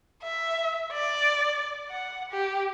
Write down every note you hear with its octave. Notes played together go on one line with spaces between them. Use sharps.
E5
D5
F#5
G4